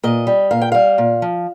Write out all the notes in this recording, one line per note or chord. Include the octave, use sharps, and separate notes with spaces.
A#2 D#5
G3
A#2 F5
G5
G3 F5
A#2
F3